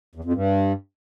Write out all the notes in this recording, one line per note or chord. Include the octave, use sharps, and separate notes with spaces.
E2
F2
G2